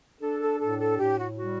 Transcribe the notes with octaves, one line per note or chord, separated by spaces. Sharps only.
D4 A4
A4
A2 A4
A4
A2 G4
F#4
G3 F#4